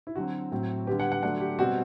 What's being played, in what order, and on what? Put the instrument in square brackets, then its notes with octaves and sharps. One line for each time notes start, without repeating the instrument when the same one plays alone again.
[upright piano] E4
D3 F#3 C4 F#4
A2 F#3 C4
D3 G3 B3 G4
F#5
F#5
D3 F#3 A3 D4 F#5
G4
B2 G3 C4 F#4